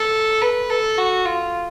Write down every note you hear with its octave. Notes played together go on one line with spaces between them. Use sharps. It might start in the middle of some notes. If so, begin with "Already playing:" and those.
Already playing: A4
B4
A4
F#4
F4